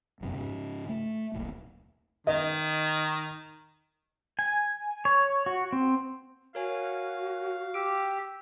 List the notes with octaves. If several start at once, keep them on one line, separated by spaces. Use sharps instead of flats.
F1 F#2 C3
G#2 C#3
A3
D#1 B1 A#2
D#3 D#5
G#5
C#5
F#4
C4
F#4 A#4 C#5 F5 G#5
G4 E6 D7